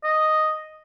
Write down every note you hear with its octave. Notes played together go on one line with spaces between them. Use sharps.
D#5